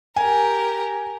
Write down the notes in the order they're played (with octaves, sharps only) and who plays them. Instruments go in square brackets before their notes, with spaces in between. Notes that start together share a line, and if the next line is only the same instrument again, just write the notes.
[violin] G4 A#4 [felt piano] G#5